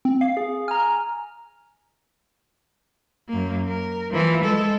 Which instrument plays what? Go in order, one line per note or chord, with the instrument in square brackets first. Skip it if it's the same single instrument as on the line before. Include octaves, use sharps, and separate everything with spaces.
[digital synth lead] C4
F5
[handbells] G#4
[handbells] G#5 A#5 [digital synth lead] F6
[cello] F#2 A#3
A#4
E3 F3
G#3 A4